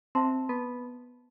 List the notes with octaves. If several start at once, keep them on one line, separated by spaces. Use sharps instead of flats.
C4 C5 E5 A5 C6
B3